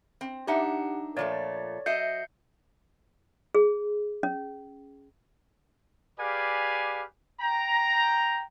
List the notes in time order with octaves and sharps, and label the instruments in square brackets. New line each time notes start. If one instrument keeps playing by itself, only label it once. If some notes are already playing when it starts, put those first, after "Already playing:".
[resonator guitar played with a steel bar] C4
[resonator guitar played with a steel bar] D4 D#4 E5 [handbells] G4 F#5
[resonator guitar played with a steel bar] A#2 F3 A3 [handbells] C#5 D5
[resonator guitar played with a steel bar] F#3 D#5 E5 [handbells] G6 C7 C#7
[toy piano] G#4
C#4
[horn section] G4 G#4 B4 D5 F5 G#5
G5 A#5